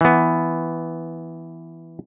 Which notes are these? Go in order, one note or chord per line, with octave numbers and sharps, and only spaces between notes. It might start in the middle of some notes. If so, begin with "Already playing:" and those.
E3 B3